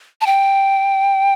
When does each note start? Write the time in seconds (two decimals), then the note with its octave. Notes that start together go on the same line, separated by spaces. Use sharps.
0.21 A5
0.26 G5